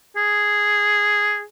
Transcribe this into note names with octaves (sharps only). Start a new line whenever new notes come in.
G#4